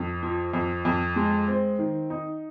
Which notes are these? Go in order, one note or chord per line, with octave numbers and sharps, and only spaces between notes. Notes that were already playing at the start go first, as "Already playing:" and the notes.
Already playing: F2
F3
F2
F2
G#3
C4
D#3
D#4